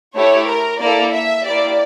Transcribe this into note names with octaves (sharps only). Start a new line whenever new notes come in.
A3 E4 G4 C#5
A#4
A#3 E4 A4 D5
E5
A#3 E4 G4 D5